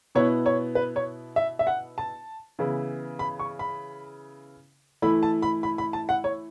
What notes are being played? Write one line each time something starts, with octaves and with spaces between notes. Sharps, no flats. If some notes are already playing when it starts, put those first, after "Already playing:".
B2 B3 E4 C#5
C#5
B4
C#5
E5
E5
F#5
A5
C#3 E3 B3 E4
B5
C#6
B5
E3 A3 E4 B5
A5
B5
B5
B5
A5
F#5
C#5